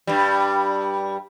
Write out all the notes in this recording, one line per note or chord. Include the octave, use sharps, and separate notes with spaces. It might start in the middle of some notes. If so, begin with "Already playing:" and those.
G2 G3